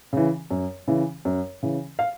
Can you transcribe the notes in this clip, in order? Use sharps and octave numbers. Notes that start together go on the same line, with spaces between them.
C#3 E3
F#2
C#3 E3
F#2
C#3 E3
F5